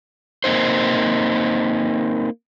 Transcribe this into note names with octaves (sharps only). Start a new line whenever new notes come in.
A#3 C4 D#4 C5